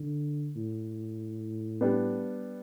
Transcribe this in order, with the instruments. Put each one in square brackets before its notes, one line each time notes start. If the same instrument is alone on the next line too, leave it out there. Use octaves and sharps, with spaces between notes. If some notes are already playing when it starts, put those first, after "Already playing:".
Already playing: [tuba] D3
A2
[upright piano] G3 B3 D4